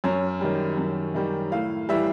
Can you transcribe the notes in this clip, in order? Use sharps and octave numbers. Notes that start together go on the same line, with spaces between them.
F#2 C#5
D#3 G3
F#2
D#3 G3
A2 F5
E3 G3 E5